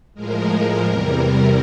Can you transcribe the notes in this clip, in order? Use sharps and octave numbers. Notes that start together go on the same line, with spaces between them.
A2 F3 G#3 A#4
E2 C3 E3 G3